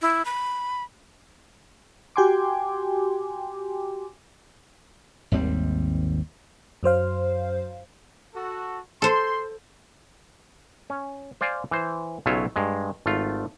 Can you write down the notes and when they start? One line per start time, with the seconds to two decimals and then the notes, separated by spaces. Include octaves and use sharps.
0.02 E4
0.25 B5
2.16 F#4 G4 G5 G#5 C6 D6
5.32 G#1 D#2 G3 C4
6.83 F#2 F#3 C5 F5
8.34 F#4 A4
9.02 A4 C5 C6
10.90 C#4
11.41 C5 D5 F5 G#5
11.71 E3 C5
12.26 B1 C#3 F#3 F4 C#5 E5
12.56 G2 G#3
13.06 G#1 A3 F4